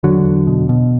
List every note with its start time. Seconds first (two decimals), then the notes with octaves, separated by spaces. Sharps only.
0.03 E2 D3 F#3
0.25 E2
0.47 B2
0.69 B2